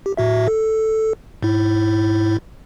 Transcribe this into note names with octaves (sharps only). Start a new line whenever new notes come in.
G4
A2 F#4 E5
A4
G#2 E4